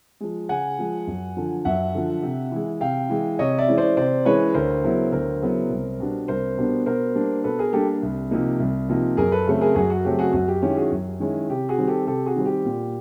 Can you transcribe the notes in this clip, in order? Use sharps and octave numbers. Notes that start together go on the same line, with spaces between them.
F3 G#3
C#3 F#5 G#5
F3 G#3
F#2
D3 F3
F#2 E5 F#5
D3 F3
C3
E3 G#3
C3 F5 G5
E3 G#3
C3 C#5 D#5
D5 E5
E3 G#3 C#4 E4
C5 D5
C3 C5 D5
E3 G#3 C#4 E4 B4 C#5
D2 A#4 C5
C#3 F#3 B3 E4
D2 A#4 C5
C#3 F#3 B3 E4
C2
B2 G3 B3 D4
C2 A#4 C5
B2 G3 B3 D4
B2 A#4 C5
G3 A#3 D4
B2 A4 B4
G#4 A#4
G3 A#3 D4 G4 A4
C2
C3 F3 A#3 D#4
C2
C3 F3 A#3 D#4
F#2 G#4 A#4
A4 B4
C#3 F#3 A3 C4
G#4 A#4
F#2 F#4 G#4
F#4
C#3 F#3 A3 C4 G4
F#4 G#4
F#2 F#4
G4
D#3 G#3 C#4 E4 G4
F#4 G#4
F#2
D#3 G#3 C#4 E4
C3 G4
F#4 G#4
D#3 G3 C4
G4 A4
C3 G4 A4
F#4 G#4
D#3 G3 C4
G4
A#2